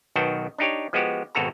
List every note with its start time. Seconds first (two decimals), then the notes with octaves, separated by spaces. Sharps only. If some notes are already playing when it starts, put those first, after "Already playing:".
0.16 B1 D#3 B3 F#4 G5 A5
0.58 D4 D#4 G4 C#5
0.93 F3 G#3 B3 F#4 G4
1.35 G#1 B2 F#4 A4 A#5